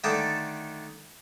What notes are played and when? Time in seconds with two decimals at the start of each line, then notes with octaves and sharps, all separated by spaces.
0.04 D3 D#3 A3 A4 D5